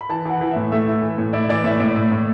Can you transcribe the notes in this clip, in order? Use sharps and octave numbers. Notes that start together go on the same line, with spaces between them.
B5
E3 A5
E3 F#5
E3
A2 E5
A3 E5
E4
E3
A2
E4 D5
E3 D5
A2 E5
A2 D5
A2
A2